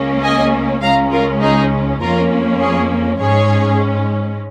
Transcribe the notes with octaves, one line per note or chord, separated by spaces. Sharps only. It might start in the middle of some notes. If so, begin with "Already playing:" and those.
Already playing: C#2 C#3 A#3 C#4
D#5 G#5
C#2 C#3 G#3 C#4 F5 A#5
F4 A#4
D#4 G#4
F2 F3 A#3 C#4 F4 A#4
G#4 C#5
G#2 G#3 C#4 G#4 C#5